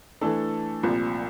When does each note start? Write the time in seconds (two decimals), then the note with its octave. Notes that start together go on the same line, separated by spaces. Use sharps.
0.21 E3 A3 D4 A4
0.83 C2 A#2 F3